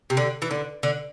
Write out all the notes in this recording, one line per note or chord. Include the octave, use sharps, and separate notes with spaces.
C3
D3
E3
D3
D3